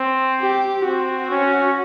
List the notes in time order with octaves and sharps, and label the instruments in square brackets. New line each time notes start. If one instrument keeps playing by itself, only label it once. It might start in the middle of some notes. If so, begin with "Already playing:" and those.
Already playing: [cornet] C4
[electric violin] G4
[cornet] C4 [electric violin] F#4
[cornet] C#4